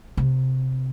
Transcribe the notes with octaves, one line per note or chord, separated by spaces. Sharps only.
C3